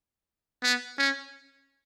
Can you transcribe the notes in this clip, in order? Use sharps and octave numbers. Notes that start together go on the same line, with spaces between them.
B3
C#4